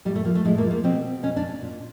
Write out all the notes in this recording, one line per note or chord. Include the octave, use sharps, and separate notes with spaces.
A2 G3
A3
F3 A#3
A3
A2 G#3
A#3
F3
A#3
B2 C4
B2 C#4
D4
A#2